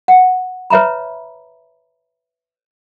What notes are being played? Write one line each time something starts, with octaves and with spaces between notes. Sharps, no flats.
F#5
B4 C#5 E5 A#5 B5